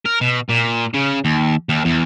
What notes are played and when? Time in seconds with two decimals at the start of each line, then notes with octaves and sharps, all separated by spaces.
0.05 A#4
0.21 B2
0.50 A#2
0.94 C#3
1.25 D#2
1.69 D#2
1.85 E2